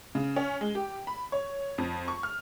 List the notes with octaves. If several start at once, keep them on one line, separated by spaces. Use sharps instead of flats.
C#3
C#4
G#3
G4
B5
C#5
F2
C#6
F6